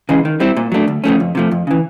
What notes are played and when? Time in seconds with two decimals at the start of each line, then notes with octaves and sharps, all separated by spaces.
0.09 C#3 E3 G#3
0.25 D#3
0.40 G3 C4 E4
0.57 A#2
0.72 F#3 A3 D4
0.88 D2
1.04 C#3 F3 A3 C#4
1.20 F2
1.35 C3 F3 A3
1.51 F2
1.67 C#3 E3